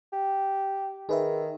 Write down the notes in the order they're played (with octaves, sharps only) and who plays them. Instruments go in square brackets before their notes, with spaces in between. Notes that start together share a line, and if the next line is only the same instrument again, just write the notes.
[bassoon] G4
[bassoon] D#3 [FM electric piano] G#4 B4 E5